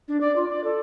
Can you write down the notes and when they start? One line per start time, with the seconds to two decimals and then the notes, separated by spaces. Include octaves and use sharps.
0.08 D4
0.21 D5
0.36 F4
0.50 D5
0.64 A4